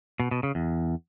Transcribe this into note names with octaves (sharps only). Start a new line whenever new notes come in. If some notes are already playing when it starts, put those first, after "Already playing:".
B2
B2
C#3
E2